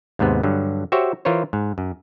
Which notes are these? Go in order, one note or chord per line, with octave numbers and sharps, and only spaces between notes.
D#2 G#2 C3 B3
G2 D3 F#3
F#4 G4 C5 C#5 E5
E3 F4 A#4 C5 C#5
G#2
F#2